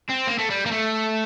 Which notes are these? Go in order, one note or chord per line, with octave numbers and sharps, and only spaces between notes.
C4
A#3
A3
G3
A#3
A3